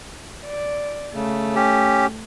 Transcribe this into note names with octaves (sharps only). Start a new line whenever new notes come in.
D5
C#3 A3
C#4 G4